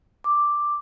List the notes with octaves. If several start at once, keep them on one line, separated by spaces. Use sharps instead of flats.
D6